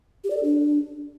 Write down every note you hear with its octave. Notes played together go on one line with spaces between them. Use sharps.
G4
D5
A4
D4